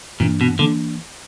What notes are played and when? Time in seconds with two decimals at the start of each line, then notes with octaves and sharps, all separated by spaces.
0.20 G2 A#2 E3 A#3 D4
0.41 B2
0.59 D3 E3 A#3 D4